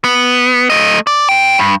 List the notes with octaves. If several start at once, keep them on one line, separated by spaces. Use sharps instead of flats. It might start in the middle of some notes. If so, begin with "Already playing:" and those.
B3
A3 D#5
D5
C3 G5
G2